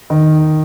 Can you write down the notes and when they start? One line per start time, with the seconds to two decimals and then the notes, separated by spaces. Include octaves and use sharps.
0.10 D#3